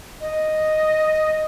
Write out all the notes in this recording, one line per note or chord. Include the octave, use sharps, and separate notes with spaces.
D#5